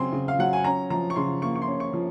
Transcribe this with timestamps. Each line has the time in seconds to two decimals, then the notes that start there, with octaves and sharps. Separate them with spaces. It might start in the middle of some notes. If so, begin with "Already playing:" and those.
Already playing: C#3 F#3 C4 G#5 C6
0.13 C#3
0.28 F5
0.39 F#3 F#5
0.53 G#5
0.64 C#4 A#5
0.90 F3 A#5
1.10 C#6
1.16 C#3 C6
1.42 A#3 C#6
1.56 C#6
1.62 C6
1.67 C#4
1.80 C#6
1.93 F3